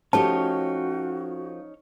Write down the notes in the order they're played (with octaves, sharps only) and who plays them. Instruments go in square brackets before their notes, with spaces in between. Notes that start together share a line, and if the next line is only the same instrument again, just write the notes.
[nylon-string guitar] F3 A3 G4 [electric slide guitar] C#4 D#4 C#5 [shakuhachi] F#4 [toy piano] A5